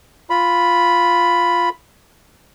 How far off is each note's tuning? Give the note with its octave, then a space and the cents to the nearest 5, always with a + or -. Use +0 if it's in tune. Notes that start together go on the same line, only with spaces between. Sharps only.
F4 +0 B5 +0